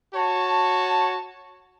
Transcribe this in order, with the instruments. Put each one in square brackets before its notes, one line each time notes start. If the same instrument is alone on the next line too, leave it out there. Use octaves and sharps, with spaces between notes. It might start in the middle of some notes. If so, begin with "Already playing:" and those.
[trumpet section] F#4 C#5 A5